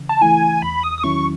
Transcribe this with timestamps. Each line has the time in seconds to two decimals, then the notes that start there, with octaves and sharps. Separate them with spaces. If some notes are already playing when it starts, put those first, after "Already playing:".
Already playing: C#3 E3
0.09 A5
0.21 E3 A3 E4 G#5
0.62 E2 B5
0.83 D#6
0.98 D#6
1.03 D#3 F#3 C#4 E4 C#6